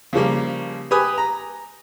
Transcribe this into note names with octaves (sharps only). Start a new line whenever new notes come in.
C#3 F3 G3 A#3
G4 B4 G#5 B5 D#6
A#5